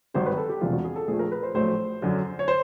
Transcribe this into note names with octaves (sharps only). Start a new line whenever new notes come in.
G#1 G2 D#3 F#3 C5
B4
A4
G4
E1 E2 C3 E3 G#3 F4
F#4
G#4
A4
A#1 A#2 F3 A3 G#4
A#4
B4
C5
A#1 A2 F#3 A3 C5
F#2 D3 F#3
C#5
C5